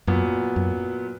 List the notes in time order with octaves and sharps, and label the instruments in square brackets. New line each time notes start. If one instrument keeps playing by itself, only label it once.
[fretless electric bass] F#2 [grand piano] A#2 F#3 B3
[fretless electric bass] F#2